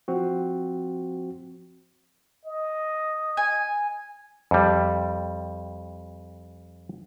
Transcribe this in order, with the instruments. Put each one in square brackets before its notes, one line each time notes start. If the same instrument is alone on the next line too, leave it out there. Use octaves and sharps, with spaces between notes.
[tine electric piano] F3 C4 F#4
[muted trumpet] D#5
[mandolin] G#5
[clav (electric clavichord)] F2 G3